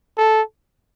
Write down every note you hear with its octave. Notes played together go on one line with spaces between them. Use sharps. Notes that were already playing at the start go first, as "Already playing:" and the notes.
A4